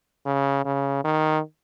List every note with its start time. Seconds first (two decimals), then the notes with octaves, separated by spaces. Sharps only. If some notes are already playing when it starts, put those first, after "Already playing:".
0.26 C#3
0.65 C#3
1.04 D#3